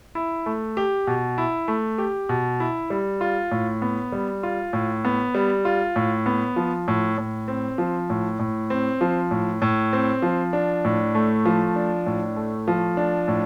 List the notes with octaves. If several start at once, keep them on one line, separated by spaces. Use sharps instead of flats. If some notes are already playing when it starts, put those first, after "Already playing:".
E4
A3
G4
B2
E4
A3
G4
B2
E4
G3
F4
A2
B3
G3
F4
A2
B3
G3
F4
A2
B3
F3
A2
A2
C4
F3
A2
A2
C4
F3
A2
A2
C4
F3
D4
A2
A3
F3
D4
A2
A3
F3
D4
A2